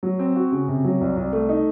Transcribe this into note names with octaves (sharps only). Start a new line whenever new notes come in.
F#3
C4
F#4
C#3
C3
F#3
C2
C2
A3
D#4